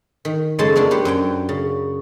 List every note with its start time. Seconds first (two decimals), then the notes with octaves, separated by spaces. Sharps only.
0.25 D#3
0.59 F#2 C#3 G#3 A4 C5 A5
0.76 A#3 B3 D4 F4
0.91 G4 B4 C5 F#5
1.05 F#2 F#3 G5
1.49 C#3